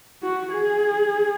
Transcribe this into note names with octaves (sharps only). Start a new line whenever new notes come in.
F#4
G#4